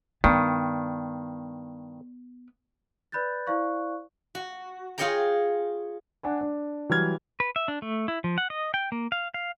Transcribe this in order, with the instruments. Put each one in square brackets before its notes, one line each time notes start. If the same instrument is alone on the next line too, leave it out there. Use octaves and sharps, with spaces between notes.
[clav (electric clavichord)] G2 D#3 [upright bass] B3
[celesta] B4 D5 B5 F#6 G6 A6
E4 C5 D5 F5 C#6 F#6
[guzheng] F#4
F4 G#4 C#5 D#5 G5 A#5
[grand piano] D4 F#5 G#5
D4
E3 F#3 G3 F6 G#6
[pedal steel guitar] B4
E5
D4
A3
E4
F3
F#5
D#5
G5
A#3
F5
F5